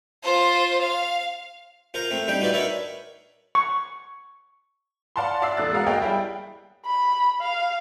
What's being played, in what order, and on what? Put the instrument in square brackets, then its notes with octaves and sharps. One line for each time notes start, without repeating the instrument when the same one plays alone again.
[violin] F4 C5
F5
[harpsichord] F4 A#4 C5 F5 A#5
A3 C4 A#4
G3 D4 D#4 G5
D#4 F4 F#4 B4 D5 E5
D4 D#4 A#4 B4 C#5 E5
[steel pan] C#6
[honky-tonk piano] D5 F5 F#5 A5 B5 C6
D5 E5 F5 E6 C7
E2 A2 F#6 A6
G#3 B3 F#4 A#4 F5 F#5
A#3 G#4 C#5 D#5 F5 G5
G3 E4 G5
[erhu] B5
F5